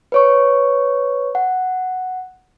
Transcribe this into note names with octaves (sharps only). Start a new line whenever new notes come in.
B4 C#5 C#6
F#5